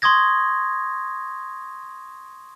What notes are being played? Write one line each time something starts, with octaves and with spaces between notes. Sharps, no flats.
C6 C#6 D#6 G#6 A#6